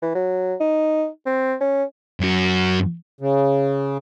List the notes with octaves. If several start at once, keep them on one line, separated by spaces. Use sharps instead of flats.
E3
F#3
D#4
C4
C#4
F#2 F#4
C#3